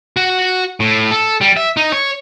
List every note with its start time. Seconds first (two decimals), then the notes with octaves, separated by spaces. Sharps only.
0.17 F#4
0.80 A2
1.11 A4
1.41 G3
1.57 E5
1.77 D#4
1.92 C#5